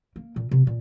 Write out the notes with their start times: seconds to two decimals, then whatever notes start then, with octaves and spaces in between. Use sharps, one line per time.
0.16 A#3
0.36 A#2
0.51 C3
0.67 A#2